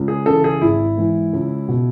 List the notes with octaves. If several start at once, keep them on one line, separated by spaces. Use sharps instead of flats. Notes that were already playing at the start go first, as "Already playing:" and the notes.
Already playing: C#2
G#4
C#3 E3 A4
G#4
G#1 E4
G#2 E3
C#2
B2